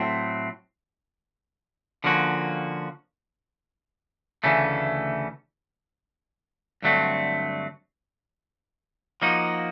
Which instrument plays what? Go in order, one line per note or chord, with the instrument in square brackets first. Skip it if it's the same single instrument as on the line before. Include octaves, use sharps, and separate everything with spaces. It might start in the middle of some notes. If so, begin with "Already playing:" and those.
Already playing: [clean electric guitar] A2 F#3 A3 C4
D3 F3 A#3 C#4 F#4
D2 C#3 E3 A3 C#4
G2 D3 F#3 A3 C4
F3 A#3 D#4 F#4